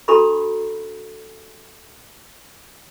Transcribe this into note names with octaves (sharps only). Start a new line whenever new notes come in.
D4 F#4 A4 A#5 B5 C#6